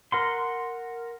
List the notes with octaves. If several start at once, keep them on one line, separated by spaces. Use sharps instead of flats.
A#4 F#5 C6